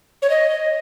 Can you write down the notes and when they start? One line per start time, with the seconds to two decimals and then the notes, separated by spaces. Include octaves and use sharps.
0.22 C#5
0.30 D#5